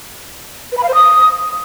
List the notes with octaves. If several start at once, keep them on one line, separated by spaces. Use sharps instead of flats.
B4
B5
F5
C5
D#6